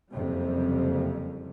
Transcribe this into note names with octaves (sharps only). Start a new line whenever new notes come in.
F#1 F2 C3 G3